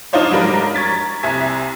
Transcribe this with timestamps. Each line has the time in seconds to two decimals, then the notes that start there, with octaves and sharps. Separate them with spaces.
0.13 D4 D#4 F4 C5 C#5
0.31 G#2 F#3 G3 D4 A#4 B5
0.75 A#5 C#6 G#6 A6 B6
1.23 C2 C3 E5 G#5 G#6 B6